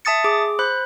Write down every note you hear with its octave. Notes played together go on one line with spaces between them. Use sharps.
E5 A5 D#6 A6 C#7
G#4 D6
C5 B5 F#6